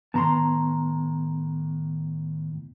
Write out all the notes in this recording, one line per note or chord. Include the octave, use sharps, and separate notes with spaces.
A2 D#3 B3 A5 A#5 C6